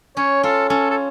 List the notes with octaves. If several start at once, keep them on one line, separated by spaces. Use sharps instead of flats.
C#4 C#5
F4 A4
C#4 A4
A4